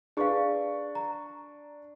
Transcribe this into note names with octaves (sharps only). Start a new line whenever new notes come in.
D4 G#4 B4 F5 C#6
A#5